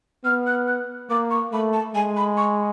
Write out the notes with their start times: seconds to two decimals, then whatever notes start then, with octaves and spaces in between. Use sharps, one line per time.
0.24 B3 F6
0.46 F#6
0.67 F#6
1.09 A#3 D6
1.30 C#6
1.52 A3 B5
1.73 A5
1.94 G#3 G#5
2.16 B5
2.37 C#6